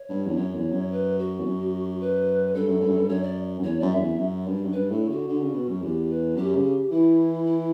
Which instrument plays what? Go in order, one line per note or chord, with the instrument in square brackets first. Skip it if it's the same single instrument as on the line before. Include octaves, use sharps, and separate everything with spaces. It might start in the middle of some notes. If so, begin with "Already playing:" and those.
Already playing: [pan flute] C#5
[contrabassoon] G2
E2
[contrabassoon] F#2 [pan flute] C#5
[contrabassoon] E2
F#2
[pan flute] B4
F#4
[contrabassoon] E2
F#2
[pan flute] B4
[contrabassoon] G2 [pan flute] A4
[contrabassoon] F#2
G2
F#2
G2
[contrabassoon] F#2 [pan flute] C#5
[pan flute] D5
[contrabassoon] F#2
[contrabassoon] E2 [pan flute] C#5
[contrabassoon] F#2 [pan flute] D5
[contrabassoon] F#2 [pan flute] E5
[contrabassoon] E2
F#2
G2
F#2
[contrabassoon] G2 [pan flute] B4
[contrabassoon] A2 [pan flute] A4
[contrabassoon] D3 [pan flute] F#4
[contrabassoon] D3
C#3
B2
F#2
[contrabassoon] E2 [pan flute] G4
[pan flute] B4
[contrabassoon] F#2 [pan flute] G4
[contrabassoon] C#3
[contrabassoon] E3 [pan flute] E4
[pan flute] E4